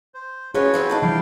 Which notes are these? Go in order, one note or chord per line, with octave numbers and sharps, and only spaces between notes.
C5
F3 C#4 F#4 G#4 B4 C#5
F3 G3 C4
D#2 D4 A5
E3 F3 G3 E4 F5 G5